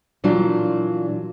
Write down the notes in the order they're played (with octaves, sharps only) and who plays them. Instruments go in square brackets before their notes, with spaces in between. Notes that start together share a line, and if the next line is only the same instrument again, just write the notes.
[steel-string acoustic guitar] A#2 E3 F#3 D4 F4